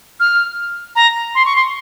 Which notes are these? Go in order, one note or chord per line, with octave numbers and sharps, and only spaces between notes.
F6
A#5
C6
C#6
C6